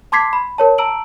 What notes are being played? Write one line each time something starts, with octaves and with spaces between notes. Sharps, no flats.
A5 C6 D6 G#6 B6 C7
B5
A#4 C#5 A5
A5 A#5 E6 D7 F#7